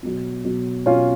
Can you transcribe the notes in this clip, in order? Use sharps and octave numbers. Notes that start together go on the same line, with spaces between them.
B2 F#3
B2 F#3
B2 F#3 C#4 F4